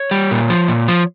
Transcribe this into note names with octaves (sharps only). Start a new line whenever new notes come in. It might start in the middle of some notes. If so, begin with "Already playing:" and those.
Already playing: C#5
G3
A#2
F3
A#2
F3